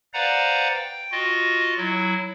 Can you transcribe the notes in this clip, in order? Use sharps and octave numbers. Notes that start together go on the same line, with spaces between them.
B4 C5 D5 F5 F#5 A#5
G5
F4 F#4 D#5
F#3 E4